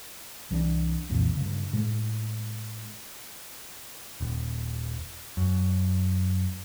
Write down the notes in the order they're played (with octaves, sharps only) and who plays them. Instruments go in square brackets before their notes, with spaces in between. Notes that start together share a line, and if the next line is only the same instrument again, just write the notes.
[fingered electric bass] C2 E3 F#3 D4
C2 F2 A#2 E3
G2 C#3
A2 G#3
[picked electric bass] D#1
F#2